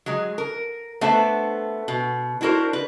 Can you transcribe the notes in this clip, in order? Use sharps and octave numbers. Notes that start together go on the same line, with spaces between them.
F#3 G#3
A#4
A3 B3 D4 C5 E5 A5
B2
D4 E4 F#4 A#4 C5
B4